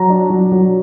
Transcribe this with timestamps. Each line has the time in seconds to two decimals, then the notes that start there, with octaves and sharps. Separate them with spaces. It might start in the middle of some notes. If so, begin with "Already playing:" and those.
Already playing: F#3 A#5
0.10 D4
0.30 F#3
0.52 F#3